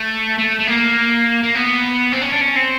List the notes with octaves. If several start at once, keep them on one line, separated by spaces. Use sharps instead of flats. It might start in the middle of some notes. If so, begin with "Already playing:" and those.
Already playing: A3
A3
A3
A#3
A#3
B3
C4
C#4
D4
C#4
C4